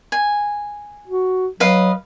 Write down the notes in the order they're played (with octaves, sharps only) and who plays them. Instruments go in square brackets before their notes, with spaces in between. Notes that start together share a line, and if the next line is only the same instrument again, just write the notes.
[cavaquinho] G#5
[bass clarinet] F#4
[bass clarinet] F#3 [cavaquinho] B4 D#5 F5